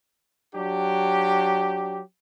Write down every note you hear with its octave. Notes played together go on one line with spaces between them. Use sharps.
F#3 D4 G4